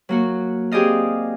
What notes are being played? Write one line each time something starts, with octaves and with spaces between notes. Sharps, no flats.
F#3 A#3 F#4
C4 G4 G#4 D5 D#5 F5